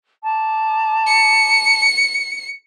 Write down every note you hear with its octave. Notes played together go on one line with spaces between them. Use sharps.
A5 A#5 D6
C#7